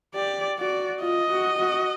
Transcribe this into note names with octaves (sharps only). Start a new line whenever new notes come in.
G4 D5
F#4 D5
F4 D#5
F#4
F#4